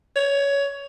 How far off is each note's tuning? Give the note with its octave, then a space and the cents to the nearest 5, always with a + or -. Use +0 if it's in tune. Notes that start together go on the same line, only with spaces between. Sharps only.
C#5 +15